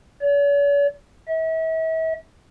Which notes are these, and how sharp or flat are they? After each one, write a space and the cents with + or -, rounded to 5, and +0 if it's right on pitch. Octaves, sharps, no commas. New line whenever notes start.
C#5 +45
E5 -40